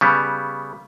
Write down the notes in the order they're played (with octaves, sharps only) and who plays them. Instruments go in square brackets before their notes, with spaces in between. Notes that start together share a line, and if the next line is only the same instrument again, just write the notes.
[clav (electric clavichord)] C#3 G3 B3